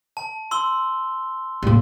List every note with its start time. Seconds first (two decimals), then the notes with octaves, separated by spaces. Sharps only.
0.17 A5
0.51 C6 E6 G7
1.63 A2 A#3